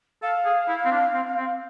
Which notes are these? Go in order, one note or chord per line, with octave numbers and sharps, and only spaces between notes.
A4 F5
G#4
E4
C4
D4
C4
C4